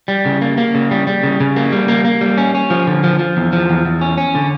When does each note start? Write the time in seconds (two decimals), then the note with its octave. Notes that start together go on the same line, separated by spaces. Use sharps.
0.08 G3
0.26 C#3
0.42 A#3
0.58 A#3
0.74 C#3
0.91 G3
1.07 G3
1.23 C#3
1.40 C#3
1.56 A#3
1.72 G3
1.88 A#3
2.05 A#3
2.21 G3
2.38 C#4
2.55 C#4
2.70 F3
2.87 D3
3.04 F3
3.19 F3
3.37 E2
3.53 F3
3.70 E2
3.85 E2
4.01 C#4
4.18 C#4
4.35 D3